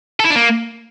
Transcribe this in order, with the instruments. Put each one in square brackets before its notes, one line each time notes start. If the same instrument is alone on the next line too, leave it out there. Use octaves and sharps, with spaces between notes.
[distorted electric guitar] A4
E4
D4
A#3